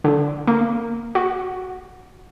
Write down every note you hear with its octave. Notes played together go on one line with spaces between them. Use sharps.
D3
A#3
F#4